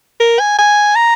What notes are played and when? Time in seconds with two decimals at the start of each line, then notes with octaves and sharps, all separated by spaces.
0.20 A#4
0.39 G#5
0.59 G#5
0.95 A#5